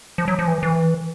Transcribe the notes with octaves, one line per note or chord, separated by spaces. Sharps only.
F3
F#3
F3
E3
E3